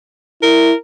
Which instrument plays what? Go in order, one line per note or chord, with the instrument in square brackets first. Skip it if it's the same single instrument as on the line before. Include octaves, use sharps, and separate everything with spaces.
[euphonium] E4 [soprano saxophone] A#4